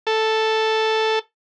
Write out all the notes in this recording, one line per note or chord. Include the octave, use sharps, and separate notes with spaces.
A4